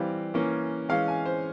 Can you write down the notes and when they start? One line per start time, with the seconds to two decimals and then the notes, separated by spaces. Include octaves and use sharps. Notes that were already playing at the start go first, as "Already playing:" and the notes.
Already playing: E3 G3 C4 F5
0.34 E3 A#3 C#4
0.89 E3 G#3 C#4 F5
1.08 G#5
1.26 C5